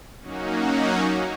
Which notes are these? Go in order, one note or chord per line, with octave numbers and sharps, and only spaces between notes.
F#3 A#3 C#4 D#4 F#4